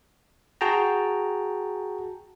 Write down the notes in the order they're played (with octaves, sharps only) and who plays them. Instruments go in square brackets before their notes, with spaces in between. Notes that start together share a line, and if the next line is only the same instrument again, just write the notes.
[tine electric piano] F#4 G#4 G5 A5 A#5